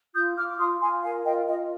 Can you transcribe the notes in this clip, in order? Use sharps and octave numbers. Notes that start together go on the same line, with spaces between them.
F4 D#6 G6
F4 D6 F6
D6
F4 C6 D#6
F4 G#5 C6
A#4 F5 G#5
F4 D#5 G5
F4 D#5